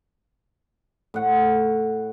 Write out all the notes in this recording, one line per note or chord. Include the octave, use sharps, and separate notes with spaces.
A2 F#5